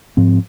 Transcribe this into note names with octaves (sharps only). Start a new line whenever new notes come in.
G#2 F3 C4